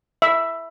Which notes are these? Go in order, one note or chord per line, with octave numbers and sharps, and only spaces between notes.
E5